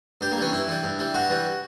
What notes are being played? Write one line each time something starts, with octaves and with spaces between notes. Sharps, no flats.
G2 G4
A#3
E3 G3 C#4
G2 E4
E3 G3
G2
E3 G3
G2 F#4
E3 G3